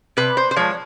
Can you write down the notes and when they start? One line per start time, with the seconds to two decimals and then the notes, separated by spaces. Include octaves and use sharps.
0.17 C3 B4
0.37 C5
0.51 C5
0.56 F3 G#3 C#5